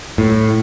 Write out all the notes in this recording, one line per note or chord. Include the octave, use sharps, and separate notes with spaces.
A2